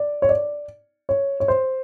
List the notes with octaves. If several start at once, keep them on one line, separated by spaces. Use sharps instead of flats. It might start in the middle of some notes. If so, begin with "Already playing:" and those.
Already playing: D5
C#5
D5
C#5
C#5
C5